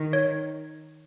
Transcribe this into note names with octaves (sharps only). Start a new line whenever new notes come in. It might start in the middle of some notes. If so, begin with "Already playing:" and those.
Already playing: D#3
C#5